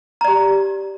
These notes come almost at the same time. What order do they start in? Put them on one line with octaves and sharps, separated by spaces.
A#5 D5 G4